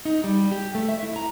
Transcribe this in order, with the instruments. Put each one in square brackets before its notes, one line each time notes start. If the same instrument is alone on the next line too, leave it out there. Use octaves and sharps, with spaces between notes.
[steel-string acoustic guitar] D#4
G3
G4
A3
E5
E4
A#5